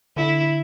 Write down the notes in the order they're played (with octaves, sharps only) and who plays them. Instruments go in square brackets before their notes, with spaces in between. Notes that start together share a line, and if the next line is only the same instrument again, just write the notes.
[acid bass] D3 [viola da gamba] E4